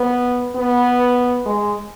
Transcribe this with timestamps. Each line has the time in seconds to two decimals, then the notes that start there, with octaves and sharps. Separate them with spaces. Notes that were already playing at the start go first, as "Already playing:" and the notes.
Already playing: B3
0.55 B3
1.46 G#3